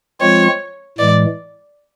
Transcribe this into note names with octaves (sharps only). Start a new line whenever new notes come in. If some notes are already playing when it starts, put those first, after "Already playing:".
F3 G#3 C4 F4 C#5
A2 E3 G#3 D5